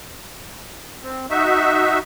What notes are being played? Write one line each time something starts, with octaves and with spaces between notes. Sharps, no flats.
C4
D#4 F#4 E5